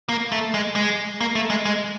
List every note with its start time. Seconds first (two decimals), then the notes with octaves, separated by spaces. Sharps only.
0.09 A#3
0.32 A3
0.54 G#3
0.75 G#3
1.21 A#3
1.35 A3
1.50 G#3
1.65 G#3